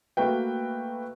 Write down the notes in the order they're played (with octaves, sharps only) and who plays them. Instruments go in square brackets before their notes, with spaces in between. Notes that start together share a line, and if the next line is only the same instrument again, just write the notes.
[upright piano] A3 A#3 F#4 B4 G5